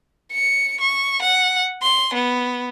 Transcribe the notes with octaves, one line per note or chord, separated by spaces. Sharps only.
C#7
C#6
F#5
C6
B3